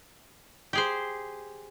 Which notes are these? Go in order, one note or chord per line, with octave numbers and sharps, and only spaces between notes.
G4 G#4 C5